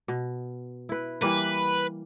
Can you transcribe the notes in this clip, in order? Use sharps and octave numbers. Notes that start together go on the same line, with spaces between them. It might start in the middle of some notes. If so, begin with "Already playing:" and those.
B2
E4 B4
E3 G3 A#3 B4